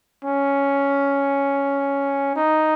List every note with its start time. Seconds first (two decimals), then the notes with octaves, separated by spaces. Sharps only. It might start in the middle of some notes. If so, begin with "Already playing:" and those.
0.25 C#4
2.36 D#4